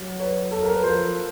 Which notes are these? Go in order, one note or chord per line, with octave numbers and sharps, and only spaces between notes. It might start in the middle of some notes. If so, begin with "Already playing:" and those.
Already playing: F#3
B4 C#5
A4
A#4
B4
F3 A#4 C5